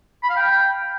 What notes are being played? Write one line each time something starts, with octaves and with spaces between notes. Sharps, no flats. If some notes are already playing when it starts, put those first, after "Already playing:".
B5
F5
G5